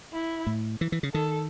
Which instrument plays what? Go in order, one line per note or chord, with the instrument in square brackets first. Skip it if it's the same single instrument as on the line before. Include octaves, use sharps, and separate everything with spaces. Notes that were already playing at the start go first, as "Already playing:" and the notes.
[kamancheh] E4
[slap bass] A2
E3
E3
C#3
[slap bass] D#3 [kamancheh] A4